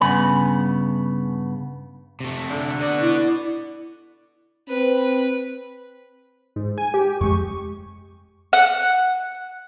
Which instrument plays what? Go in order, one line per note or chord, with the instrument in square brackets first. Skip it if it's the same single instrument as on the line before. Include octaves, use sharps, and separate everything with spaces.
[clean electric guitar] G2 C#3 B3 G#5 B5
[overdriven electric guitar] C3 A3
[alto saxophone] D3
[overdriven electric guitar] B3 F#4 [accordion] D5
[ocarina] E4
[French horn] C4 [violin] B4
[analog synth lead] G#2
G#5
G4
[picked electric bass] F2 G#3 [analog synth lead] C#6
[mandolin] F#5